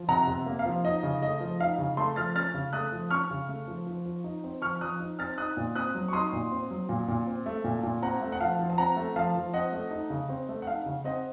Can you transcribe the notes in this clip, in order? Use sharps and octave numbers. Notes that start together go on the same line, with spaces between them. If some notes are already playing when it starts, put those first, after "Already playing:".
Already playing: F3
C3 F#5 A#5
C3
A#3
F5
F3
D#4 D#5
C#3
A3 D#5
F3
D#4 F5
C#3
A3 A5 C6
F3 F6 A6
C#4 F6 A6
C#3
A3 D#6 F#6
F3
C#4 C#6 F6
C#3
A3
F3
F3
F3
D#4
C4
F3 C#6 F6
F3 D#6 F#6
D#4
C4 F6 A6
D#4 D#6 F#6
A#2
C4 D#6 F#6
F#3
C#6
D#4 C6 D#6
A#2
C4
F#3
A#2
A#2
C4
A3
A#2
A#2
C4 F#5 A#5
A3
F#5
F3 F5 A5
F3
A5
C4 F#5 A#5
A3
F3 F5 A5
F3
C4 D#5 F#5
A3
D#4
C#3
C4
A3
F#5
D#4 F5
C#3
C4 D#5 F#5